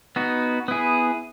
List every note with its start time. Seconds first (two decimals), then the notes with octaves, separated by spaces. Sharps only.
0.16 B3 D#4 F#4
0.68 B3 E4 G#4